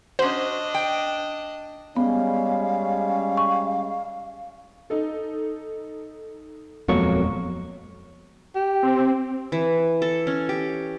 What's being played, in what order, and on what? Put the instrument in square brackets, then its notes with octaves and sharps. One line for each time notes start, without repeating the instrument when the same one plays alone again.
[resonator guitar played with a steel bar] C#4 F#4 [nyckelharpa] D4 D#5 [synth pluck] C5
[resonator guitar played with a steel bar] G5
[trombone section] G3 G#3 C#4 [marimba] B3 [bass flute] F5
[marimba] C#6
[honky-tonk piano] D#4 A4
[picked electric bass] D#1 G#3 B3 [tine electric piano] F2 F#3 C#6 [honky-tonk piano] A#3
[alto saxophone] G4
[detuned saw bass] C4
[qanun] E3
A4
C#4
G4